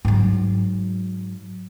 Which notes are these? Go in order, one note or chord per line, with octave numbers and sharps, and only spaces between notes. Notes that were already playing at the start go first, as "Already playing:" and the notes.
G#2 F#3